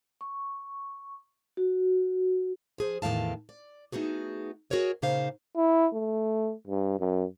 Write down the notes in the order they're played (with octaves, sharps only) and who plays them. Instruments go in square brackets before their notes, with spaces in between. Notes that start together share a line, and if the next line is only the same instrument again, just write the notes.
[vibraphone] C#6
F#4
[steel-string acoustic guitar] F3 G#4 C5
E2 A2 D#3 F5 A5
D5
A3 B3 D#4 F#4 G#4
F#4 G#4 A#4 C#5 D#5
A#2 C#3 D#4 C5 F5
[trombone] E4
A3
G2
F#2